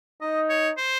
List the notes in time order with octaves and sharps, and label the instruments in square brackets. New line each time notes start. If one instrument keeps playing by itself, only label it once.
[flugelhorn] D#4 [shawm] D#5
[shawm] C#5
C5